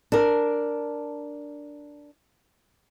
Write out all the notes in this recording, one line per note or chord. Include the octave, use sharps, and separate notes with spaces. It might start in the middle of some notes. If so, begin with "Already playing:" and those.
D4 A#4